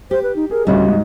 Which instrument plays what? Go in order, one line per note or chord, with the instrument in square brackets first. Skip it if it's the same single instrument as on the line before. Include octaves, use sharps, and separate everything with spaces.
[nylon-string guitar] G4 [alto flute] C5
[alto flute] B4
D#4
[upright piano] G#4 [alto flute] A#4
[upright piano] A1 D2 [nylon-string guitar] C#3 G3 [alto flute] D#5
[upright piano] G#2